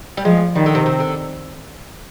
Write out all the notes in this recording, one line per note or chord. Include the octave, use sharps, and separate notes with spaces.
G3
F3 G#3
D#3 G3
D3
C3
C3
D3